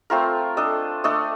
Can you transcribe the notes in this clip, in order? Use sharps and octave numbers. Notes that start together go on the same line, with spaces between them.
A3 C4 F4 A#4
D4 A4 D#5
A3 D4 A4 D#5